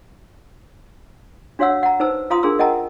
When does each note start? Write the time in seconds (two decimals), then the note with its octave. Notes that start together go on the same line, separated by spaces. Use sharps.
1.59 D4 F#4 C#5 F5 F#5 E6
1.83 F#5 A#5
2.00 D#4 B4 C5 A5 E6
2.30 F4 F5 A#5 C6 D#6
2.43 D4 G#4 A#4 C6 E6
2.59 A#4 D#5 F#5 G5 A5 A#5